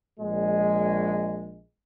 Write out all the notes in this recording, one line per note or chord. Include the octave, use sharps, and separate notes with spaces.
A#1 G#3